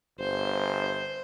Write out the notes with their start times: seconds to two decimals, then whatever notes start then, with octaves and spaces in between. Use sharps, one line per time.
0.20 G1 C5